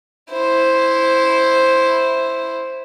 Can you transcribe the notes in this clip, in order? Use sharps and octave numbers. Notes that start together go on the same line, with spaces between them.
E4 C5